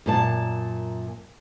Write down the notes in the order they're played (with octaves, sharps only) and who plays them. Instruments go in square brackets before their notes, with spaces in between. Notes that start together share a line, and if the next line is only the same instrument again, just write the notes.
[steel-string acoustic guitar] F#2 A#2 A5